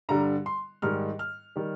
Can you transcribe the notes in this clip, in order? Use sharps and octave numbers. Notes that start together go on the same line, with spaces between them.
G2 D3 G3 A#5
C6
G#2 D#3 G3 F6
F6
D#3 G3